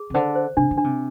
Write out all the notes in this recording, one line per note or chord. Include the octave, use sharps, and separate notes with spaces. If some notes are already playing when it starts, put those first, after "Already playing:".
Already playing: G#4
C3
D3 C5
C5
C3 D4
D3
D4
C3